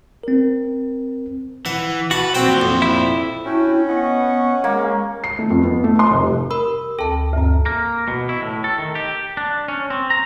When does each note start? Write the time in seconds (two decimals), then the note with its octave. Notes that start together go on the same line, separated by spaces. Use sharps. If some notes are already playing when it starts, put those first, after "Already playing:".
0.23 C4 A#4
1.66 E3 F#5
2.11 F#4 B4 A5
2.35 A#2 F#3 C4 C5 G5
2.61 F2
2.82 E4
3.45 C#4 D4 E4 F#4 G5
3.88 B3 D#5 F#5 C#6
4.64 G#3 A#3
5.24 C7
5.39 A3
5.50 F2
5.63 B3
5.84 A3
5.99 C6
6.11 F1
6.24 G3
6.51 A#4 B5 E6
6.99 D2 A4 G5 A5
7.33 D2 G2 A#5
7.66 A#3
8.08 B2
8.29 E4
8.42 A2
8.64 A4
8.79 D#3
8.95 G4
9.37 D4
9.68 C#4
9.90 C4
10.10 A#5